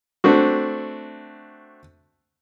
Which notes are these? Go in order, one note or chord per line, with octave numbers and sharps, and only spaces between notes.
A3 C4 D4 F#4